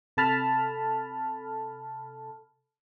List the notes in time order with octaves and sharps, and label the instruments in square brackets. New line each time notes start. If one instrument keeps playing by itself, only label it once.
[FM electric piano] C3 A4 A5 B5 F6